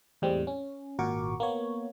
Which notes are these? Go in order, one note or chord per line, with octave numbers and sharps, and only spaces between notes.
E2 A2 G3 G#3 C4
C#4
G#1 A#2 F#4 A#4 C#6 D6
A#3 B3 C#5